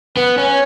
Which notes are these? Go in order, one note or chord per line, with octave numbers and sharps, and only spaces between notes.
B3 B4
C#4
C#5